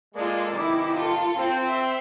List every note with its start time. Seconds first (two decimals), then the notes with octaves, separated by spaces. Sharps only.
0.14 G#3 A#3 F4 A4 D5
0.51 C3 D#3 E3 E4 D6
0.96 F4 A4
1.36 C4
1.67 E5 C6